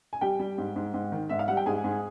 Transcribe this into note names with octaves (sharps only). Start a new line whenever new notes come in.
G#5
G3 G4 G5
G3
G#2
G#2
G#2
D#3
G#2 E5
F5
G3 F#5
G5
G#2 G#4 G#5
G#2